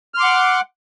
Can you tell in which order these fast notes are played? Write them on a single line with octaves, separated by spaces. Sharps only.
F6 C6 D6 F#5